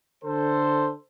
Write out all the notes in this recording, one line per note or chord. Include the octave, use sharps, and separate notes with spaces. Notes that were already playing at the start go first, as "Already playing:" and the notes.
D3 A4 C5